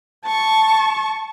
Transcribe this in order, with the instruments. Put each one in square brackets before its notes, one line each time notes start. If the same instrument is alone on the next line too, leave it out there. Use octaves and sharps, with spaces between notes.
[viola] A5 C#6